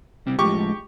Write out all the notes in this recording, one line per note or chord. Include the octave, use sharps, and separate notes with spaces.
C3 G3 C4
A2 F3 G#3 G4 C#6 D6